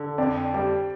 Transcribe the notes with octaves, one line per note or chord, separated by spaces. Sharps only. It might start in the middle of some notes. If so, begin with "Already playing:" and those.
Already playing: D3
F2 D5
G3 D5